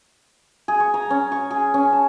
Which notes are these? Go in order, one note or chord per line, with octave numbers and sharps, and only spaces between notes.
G#4
C#6
A#5
C#4
C#6
G#4
C#4
A5